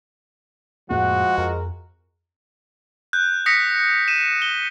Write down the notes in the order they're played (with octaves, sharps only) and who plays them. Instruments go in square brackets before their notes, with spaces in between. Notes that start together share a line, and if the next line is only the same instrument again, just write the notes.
[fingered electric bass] F2 A2 A#3 [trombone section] F3 G#3 [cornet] F#4 [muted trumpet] F#5
[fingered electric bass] F2 [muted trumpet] A#4
[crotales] F#6 G6
D#6 A#6 B6 C#7
D#7 E7
G7